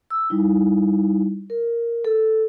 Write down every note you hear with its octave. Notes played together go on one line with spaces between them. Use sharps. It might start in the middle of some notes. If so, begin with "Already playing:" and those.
E6
G3 D#4 E4
A#4
A4